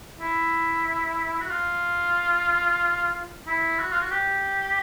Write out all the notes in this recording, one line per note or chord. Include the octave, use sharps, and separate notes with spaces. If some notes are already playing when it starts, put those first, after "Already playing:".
E4
F#4
F4
E4
F#4
F4
F#4
G4